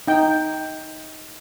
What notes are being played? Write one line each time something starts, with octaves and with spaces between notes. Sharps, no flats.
D#4 G5